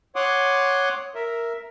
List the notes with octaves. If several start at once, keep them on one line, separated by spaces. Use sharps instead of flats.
C#5 F#5 C6 D6 D#6
A#4 E5